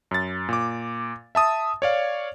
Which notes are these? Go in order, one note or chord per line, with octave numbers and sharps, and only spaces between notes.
F#2 A6
A#2 D6
E5 A5 D#6
C#5 D5 F5